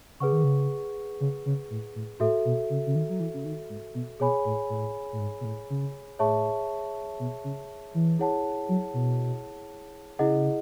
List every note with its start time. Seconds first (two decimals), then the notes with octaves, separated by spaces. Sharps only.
0.20 C#3 G#4 B4 F#5 C#6
0.32 D#3
0.44 C#3
1.20 C#3
1.46 C#3
1.70 A2
1.95 A2
2.20 A2 F#4 A4 E5
2.45 B2
2.70 C#3
2.87 C#3
2.95 D#3
3.09 F#3
3.20 E3
3.34 C#3
3.45 D#3
3.70 G#2
3.94 B2
4.20 B2 G#4 C#5 G#5 B5
4.45 A2
4.70 A2
5.13 A2
5.19 G#2
5.41 B2
5.45 A2
5.70 C#3
6.19 A2 G#4 C#5 E5 A5 C#6
7.19 B2
7.44 C#3
7.94 E3
8.19 E4 G#4 C#5 F#5 A5
8.69 F#3
8.94 B2
10.19 C#3 E4 G#4 D#5 F#5